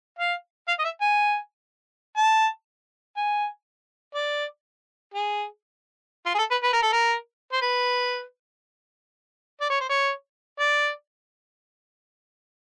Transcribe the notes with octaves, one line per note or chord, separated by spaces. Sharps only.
F5
F5
D#5
E5
G#5
A5
G#5
D5
G#4
F4
G#4
A4
B4
B4
A#4
A4
A#4
C5
B4
D5
C#5
C5
C#5
D5